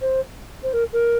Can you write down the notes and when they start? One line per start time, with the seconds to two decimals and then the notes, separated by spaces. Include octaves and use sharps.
0.01 C5
0.63 C5
0.73 A#4
0.93 A#4